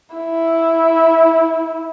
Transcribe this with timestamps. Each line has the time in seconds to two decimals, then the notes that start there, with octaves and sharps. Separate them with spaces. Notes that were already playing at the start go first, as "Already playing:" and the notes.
0.16 E4